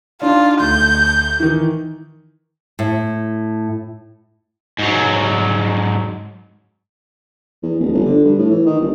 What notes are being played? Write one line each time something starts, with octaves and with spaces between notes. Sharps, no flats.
D4 D#4 F4
D2 G6
D#3 E3
A2
G#2 F#3
E2
D1
G1
D3
G2
A2
E3
D#3
G1